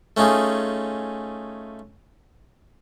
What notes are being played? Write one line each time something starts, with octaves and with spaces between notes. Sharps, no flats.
A3 C#4 D#4 F4 G#4